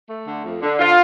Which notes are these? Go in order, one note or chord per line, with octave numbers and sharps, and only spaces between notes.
A3
D3
F2
D3
D3 F4